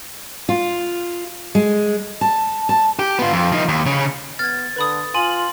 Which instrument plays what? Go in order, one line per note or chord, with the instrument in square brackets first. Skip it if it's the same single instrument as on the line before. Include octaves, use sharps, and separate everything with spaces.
[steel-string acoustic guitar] F4
G#3
A5
A5
[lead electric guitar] G4
B3 F4
F2
F3 D#4
D#2
C#3 C#4
[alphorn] B3 [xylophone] F6 G#6 [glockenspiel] A6
[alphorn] D3 [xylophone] B4 B5 D#6
[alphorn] F4 [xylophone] G#5 [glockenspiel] C6 F#7